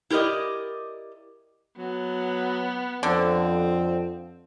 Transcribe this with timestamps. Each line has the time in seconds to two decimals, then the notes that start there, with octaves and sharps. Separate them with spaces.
0.10 E4 G4 A#4 D5 D#5
1.78 F#3 B3
3.03 F2 D3 F3 C4